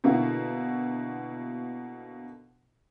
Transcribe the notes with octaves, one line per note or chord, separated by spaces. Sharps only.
B2 D3 A#3 E4 F#4